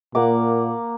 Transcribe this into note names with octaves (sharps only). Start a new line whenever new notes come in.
A#2 A#3 F#5 D6